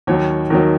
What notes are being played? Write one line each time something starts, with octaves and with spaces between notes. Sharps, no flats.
D#2 D#3 F#3 C#5
D#2 D#3 F#3 A#4